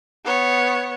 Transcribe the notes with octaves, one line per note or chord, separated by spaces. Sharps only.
B3 C#5